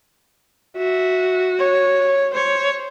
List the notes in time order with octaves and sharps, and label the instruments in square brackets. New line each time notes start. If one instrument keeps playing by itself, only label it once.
[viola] F#4 [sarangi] E5
[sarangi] C#5
[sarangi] C5 [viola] C#5